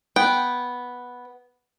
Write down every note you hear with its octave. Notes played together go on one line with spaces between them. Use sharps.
B3 G5